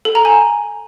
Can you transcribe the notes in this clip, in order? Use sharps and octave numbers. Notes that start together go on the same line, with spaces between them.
A4
A#5
G#5